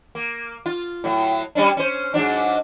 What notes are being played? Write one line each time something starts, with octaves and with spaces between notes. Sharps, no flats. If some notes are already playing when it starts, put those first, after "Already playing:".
A#3
F4
A2 F#3
G3 C#4 D4
C#4 C5
G#2 F#3 D4